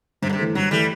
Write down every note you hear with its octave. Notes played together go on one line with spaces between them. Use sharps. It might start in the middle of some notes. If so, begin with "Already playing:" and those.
G2 C3
D3
C3
E3 A3
G2 F#3
E3 G3 A3